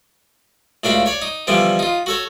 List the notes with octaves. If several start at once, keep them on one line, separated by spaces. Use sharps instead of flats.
C#2 A2 D4 F#4 F5 B5
C#5 D5
D#4
D3 E3 F3 G3 B3
D#4 F4
F#4 A4 C#5